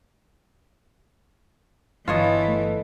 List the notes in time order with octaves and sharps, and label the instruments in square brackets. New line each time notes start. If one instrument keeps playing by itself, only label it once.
[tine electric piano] G1 B4 A5 [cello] E3 [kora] F4 C#5 D#5
[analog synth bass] A3